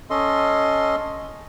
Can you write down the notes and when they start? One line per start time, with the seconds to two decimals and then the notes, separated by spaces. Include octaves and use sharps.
0.10 C#4 A4 D#5 C6